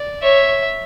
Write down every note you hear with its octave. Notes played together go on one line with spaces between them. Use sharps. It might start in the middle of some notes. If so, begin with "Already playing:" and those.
Already playing: D5
C#5 E5